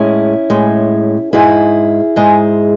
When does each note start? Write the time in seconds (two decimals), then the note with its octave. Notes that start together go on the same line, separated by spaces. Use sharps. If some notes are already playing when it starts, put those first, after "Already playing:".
Already playing: A2 G#3 C#4 E4
0.50 A2 G#3
1.33 G#2 G#3 E4 G#4
2.16 G#2 G#3